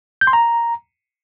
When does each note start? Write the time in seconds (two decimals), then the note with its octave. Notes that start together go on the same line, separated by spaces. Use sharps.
0.21 G6
0.27 C6
0.33 A#5